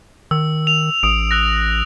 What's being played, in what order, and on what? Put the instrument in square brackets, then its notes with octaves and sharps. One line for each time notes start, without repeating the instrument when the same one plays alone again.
[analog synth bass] D#3 [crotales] E6
[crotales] F7
[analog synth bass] A1 [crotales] D#6 D7
[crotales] E6 F#6 A#6